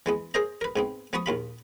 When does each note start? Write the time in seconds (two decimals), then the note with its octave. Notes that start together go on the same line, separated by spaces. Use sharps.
0.06 E3 G#3 B3
0.34 G#4 A#4 C5 D#5 A#5
0.61 A#4 B4
0.76 G#2 B3 C4
1.13 F3 B3 B4 A5 C#6 D#6
1.26 A#1 D#2 F4 B5